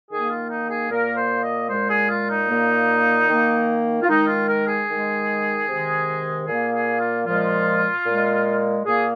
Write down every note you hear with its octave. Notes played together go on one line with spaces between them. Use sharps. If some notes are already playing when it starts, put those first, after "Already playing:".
D#3 A#3 G#4
F4
D#4
G#4
A#2 A#3 A#4
C5
D#5
A#2 G#3 C5
G#4
F4
D#4
A#2 A#3
D#3 A#3
F4
D#3 G#3 D#4
F4
A#4
G#4
D#3 G#3
C3 D#3 G#3
A#2 A#3 G#4
G#4
F4
A#2 F3 G#3 F4
A#2 G#3
A#2 A#3 G#4